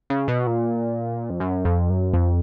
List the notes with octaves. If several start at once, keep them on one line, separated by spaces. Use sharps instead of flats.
C#3
B2
A#2
F2
F#2
F2
F#2
F2